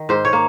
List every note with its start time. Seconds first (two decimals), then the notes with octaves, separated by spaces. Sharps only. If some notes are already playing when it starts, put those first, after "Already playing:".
Already playing: D#3
0.09 G#2 C5
0.25 C#5
0.33 A#3